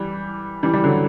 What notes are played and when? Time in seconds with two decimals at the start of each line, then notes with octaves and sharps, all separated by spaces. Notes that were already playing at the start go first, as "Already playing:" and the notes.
Already playing: E3 G3
0.63 E3 G3
0.73 E3 G3
0.84 D3 F#3